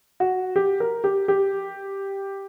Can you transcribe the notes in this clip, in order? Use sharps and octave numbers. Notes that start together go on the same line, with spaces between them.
F#4
G4
A#4
G4
G4